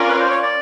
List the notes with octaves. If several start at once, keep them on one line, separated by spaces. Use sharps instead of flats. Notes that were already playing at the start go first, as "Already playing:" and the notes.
Already playing: C#4 F4 A#4 D5
B4
C5
C#5
D5